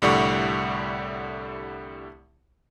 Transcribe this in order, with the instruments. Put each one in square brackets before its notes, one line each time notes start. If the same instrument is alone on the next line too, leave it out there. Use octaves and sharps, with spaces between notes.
[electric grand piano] C2 A2 D3 G3 F#5 C#6